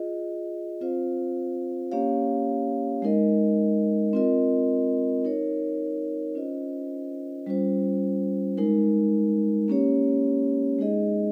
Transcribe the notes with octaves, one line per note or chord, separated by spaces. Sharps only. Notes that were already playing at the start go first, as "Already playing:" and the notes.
Already playing: F4 G#4 D#5
C4 F4 C5 F5
A#3 C#4 G4 C#5 F5
G#3 D#4 A#4 D#5
C4 F4 A#4 D#5
D#4 A#4 C#5
C#4 F4 C5 D#5
G3 C#4 F4 C5
G#3 D#4 A#4
A#3 C#4 G4 C#5
G#3 D#4 G#4 D#5